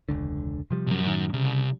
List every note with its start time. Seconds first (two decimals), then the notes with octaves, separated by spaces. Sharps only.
0.09 E1 C#2 D3
0.71 C3 F3 G3
0.87 B1 F#2
1.04 A2 D#3
1.34 C2 C#3